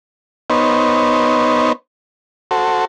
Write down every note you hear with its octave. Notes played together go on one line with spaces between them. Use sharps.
B3 D#4 C5 C#5
F#4 A4 C5